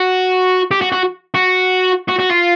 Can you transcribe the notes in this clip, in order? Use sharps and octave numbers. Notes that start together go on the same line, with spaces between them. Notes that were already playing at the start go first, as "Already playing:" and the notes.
Already playing: F#4
G4
F#4
F#4
F#4
F#4
F#4
F4